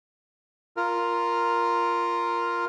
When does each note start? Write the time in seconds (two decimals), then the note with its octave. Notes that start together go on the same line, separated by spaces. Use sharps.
0.77 F4 A#4